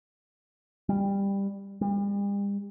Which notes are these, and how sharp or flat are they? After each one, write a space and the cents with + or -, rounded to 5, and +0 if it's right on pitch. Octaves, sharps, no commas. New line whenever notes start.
G3 +15
G3 +40